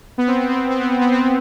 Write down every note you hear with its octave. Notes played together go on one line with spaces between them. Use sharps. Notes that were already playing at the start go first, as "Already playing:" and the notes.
B3
C4
B3
C4
B3
C4
B3
C4
B3
C4
B3